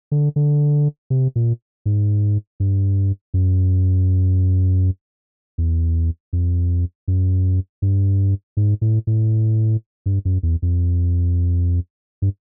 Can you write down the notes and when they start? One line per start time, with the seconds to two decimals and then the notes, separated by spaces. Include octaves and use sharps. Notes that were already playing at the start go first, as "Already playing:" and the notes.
0.12 D3
0.36 D3
1.10 C3
1.36 A#2
1.86 G#2
2.60 G2
3.34 F#2
5.58 E2
6.33 F2
7.08 F#2
7.82 G2
8.57 G#2
8.81 A2
9.07 A2
10.06 G2
10.25 F#2
10.43 E2
10.62 F2
12.22 G2